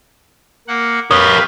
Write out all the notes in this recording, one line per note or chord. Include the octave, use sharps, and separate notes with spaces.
A#3 F#5
G4 A#4 B4 C#5 F5 D#6